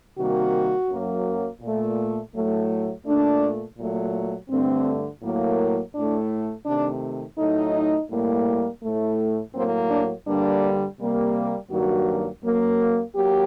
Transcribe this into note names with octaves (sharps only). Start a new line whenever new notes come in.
C3 D#3 G3 A#3 F#4
F#2 F#3 A#3
A#2 A3
A2 F#3 A3
A#2 A3 D4
A#2 F#3 A3
G2 D3 A3 C4
A2 F#3 A#3
A2 A3 D4
C3 D#3 A3 D4
A2 F#3 A3 D#4
A2 G3 A#3
A2 A3
A2 F#3 A#3 C4
D4
G2 D3 G3 A#3 D4
C3 G3 A#3
G2 D#3 F#3 A#3 F#4
F#2 F#3 A#3
F#3 A#3 G4